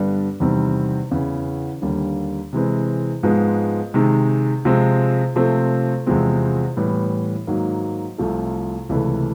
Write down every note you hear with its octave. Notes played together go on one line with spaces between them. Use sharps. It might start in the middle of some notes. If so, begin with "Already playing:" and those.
Already playing: G2 D3 G3 B3 D4
E2 C3 D#3 G3 C4
E2 C#3 E3
D#2 D3 G3 A#3
C3 E3 G#3 C4
G#2 F3 G#3 B3
C3 D#3 G#3
C3 F3 G#3 C4
C3 F3 A3 C4
E2 C3 F3 G#3 C4
A2 E3 G3 B3
G#2 D#3 F#3 A#3
C2 C3 F3 A3
C#2 C3 E3 A3